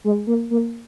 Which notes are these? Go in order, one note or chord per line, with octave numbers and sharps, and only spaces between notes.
G#3
A#3
A#3